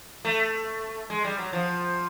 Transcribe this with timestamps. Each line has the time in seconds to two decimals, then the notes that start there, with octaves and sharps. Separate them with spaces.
0.25 A3
1.10 G#3
1.24 G3
1.38 F#3
1.53 F3